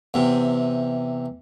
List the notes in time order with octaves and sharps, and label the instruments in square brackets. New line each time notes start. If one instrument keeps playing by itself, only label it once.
[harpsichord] E2 C3